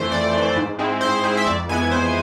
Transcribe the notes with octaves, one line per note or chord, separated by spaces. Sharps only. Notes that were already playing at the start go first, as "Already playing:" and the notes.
Already playing: F2 E3 A3 C5
F2 D5
E3 A3
G#2
G#3 C4 E4
G#2 C5
G#3 C4 E4 C5
E5
F2 D5
E3 G#3 B3 E4 G#5
F2 C5